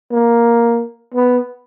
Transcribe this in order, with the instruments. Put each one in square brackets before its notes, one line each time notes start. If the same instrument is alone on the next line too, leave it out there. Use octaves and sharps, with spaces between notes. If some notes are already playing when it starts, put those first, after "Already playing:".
[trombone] A#3
B3